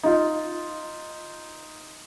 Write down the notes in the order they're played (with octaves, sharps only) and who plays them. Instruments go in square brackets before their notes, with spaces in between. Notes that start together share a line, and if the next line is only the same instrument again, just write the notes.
[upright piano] D#4 F4